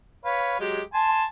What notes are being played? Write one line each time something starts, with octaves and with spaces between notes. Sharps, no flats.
B4 C#5 F5
F#3 G#3 G4
G#5 A5 C6